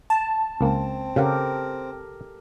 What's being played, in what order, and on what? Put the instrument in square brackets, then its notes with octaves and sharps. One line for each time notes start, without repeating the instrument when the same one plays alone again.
[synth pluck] A5
[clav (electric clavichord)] C#2 A#3 [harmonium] C4
[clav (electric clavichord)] C#3 F5 F#5 [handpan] G4 A4 A#4